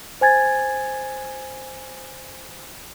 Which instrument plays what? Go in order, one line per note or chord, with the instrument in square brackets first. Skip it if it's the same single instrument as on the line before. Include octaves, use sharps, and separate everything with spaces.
[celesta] C5 G#5 G#6 A6